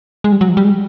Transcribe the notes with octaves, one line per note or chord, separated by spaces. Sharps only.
G#3
G3
F#3
F3
G3
G#3